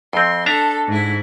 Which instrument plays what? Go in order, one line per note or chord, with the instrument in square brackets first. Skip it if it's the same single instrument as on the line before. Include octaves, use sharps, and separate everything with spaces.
[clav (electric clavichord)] F2 C4 [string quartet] C6
[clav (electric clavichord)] D4 E5 A#5 [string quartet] A4
[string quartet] G#2 E4